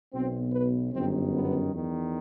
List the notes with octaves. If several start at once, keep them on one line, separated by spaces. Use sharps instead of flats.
B1 B2 C4
B4
G1 F#2 D#3 C4
B3
E2 D#3